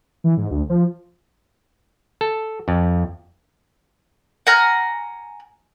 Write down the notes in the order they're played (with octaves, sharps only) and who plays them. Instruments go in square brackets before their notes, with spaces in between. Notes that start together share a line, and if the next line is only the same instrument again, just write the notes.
[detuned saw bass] E3
G#2
D2
F3
[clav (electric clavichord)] A4
F2
[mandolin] F#5 G#5 A#5 F6